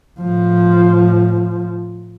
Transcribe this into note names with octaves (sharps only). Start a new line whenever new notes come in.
A2 F3